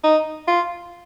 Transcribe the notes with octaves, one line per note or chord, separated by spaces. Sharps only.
D#4
F4